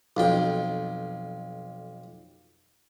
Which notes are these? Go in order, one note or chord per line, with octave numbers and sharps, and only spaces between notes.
B1 F2 G5